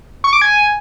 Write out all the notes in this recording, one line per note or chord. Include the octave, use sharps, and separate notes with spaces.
C#6
D6
G#5